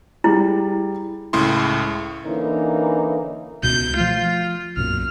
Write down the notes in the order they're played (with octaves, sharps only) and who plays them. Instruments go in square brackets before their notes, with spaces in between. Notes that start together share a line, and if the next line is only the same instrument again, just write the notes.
[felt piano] G3 G#4 [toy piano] E4
[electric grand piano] C#2 A2 C#3 E4 C6
[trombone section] D3 E3 A#3 C#4 D#4 E4
[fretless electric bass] C#2 B2 [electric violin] G6
[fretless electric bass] F3 A3 [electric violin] F4
[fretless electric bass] B1 F#2 A#2 [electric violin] F6